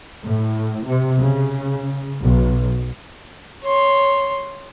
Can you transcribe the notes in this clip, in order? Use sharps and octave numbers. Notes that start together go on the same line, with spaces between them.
A2
C3
C#3
B1
C#5 C6